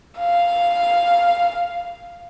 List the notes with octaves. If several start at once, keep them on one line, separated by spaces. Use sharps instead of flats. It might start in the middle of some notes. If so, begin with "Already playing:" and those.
F5